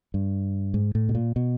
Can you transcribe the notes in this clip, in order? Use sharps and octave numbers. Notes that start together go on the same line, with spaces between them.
G2
G#2
A2
B2
A#2
B2